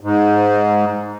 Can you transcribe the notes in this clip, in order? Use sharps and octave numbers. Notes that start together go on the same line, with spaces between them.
G#2